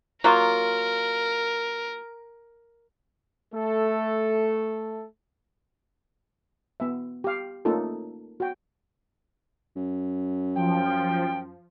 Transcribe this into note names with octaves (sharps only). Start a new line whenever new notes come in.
F#3 A#3 F4 A#4
A3 A4
B3 E5
G4 F5
A3 A#3 C#4 D#4 F4 A4
F#4 G5
F#2
F3 G5